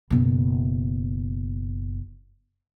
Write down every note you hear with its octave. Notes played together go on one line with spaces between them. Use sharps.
F#1 B2